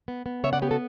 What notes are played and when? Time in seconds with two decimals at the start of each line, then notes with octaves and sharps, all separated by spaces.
0.08 B3
0.26 B3
0.44 C#3 C#5 E5
0.53 D5 F#5
0.62 B3 G4 B4
0.71 F#4 A4